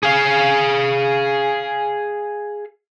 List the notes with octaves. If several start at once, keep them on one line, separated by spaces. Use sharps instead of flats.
G#4 F5